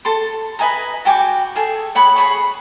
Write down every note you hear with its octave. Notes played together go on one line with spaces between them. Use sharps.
A4 C6
B4 D#5 G#5 A#5
F#4 G5 G#5 D6
G#4 A4 G#5
C#5 F#5 B5 D#6
G#4 B5 C#6